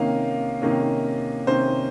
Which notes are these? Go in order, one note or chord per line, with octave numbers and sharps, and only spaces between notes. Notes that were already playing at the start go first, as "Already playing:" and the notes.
Already playing: C3 D#3 A#3 C#4 F5
C3 D#3 A#3 C#4
C3 D#3 A#3 C#4 C5